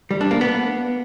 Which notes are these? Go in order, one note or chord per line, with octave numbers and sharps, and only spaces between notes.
G3
D4
A#3
B3